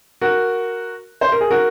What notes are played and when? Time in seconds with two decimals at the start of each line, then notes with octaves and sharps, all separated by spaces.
0.21 F#4 A#4
1.21 C5
1.32 A#4
1.41 G#4
1.51 F#4 A#4